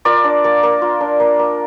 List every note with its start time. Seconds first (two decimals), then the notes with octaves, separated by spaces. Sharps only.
0.05 F4 A#4 D5
0.24 D4
0.44 A#3
0.63 A#3
0.82 F4
1.01 D4
1.20 A#3
1.39 A#3